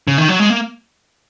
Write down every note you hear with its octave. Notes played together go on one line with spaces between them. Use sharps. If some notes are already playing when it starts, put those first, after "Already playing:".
C#3
D#3
F#3
G#3
A#3